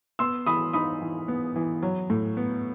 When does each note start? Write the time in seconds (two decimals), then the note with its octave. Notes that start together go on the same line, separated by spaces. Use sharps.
0.19 B3 C6 E6
0.46 E3 B5 D#6
0.73 D#4 B5 D#6
1.02 E3
1.28 B3
1.56 E3
1.82 F#3
2.10 A2
2.37 B3